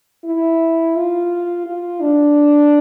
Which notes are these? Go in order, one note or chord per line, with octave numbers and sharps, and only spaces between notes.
E4
F4
F4
D4